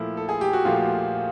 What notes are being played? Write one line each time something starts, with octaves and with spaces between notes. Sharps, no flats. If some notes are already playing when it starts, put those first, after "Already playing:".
Already playing: A#2 F3 A3 E4
A4
G#4
G4
F#4
A#2 F3 A3 F4